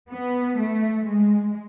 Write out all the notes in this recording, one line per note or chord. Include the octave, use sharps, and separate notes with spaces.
B3
A3
G#3